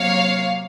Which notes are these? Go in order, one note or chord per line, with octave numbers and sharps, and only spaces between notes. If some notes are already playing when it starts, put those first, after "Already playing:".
Already playing: C3 F#3 A#3 C#5 F5